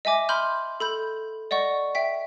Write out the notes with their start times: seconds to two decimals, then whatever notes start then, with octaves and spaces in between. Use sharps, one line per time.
0.05 D#5 E5 G#5 D6
0.29 B5 C6 F6 G6
0.80 A4 B5 G6
1.51 D5 D#5 F#5 C#6
1.95 E5 G5 B6